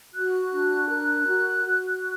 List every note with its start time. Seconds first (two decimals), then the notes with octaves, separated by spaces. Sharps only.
0.14 F#4 F#6
0.52 D4
0.89 A#4
1.26 F#4
1.65 F#4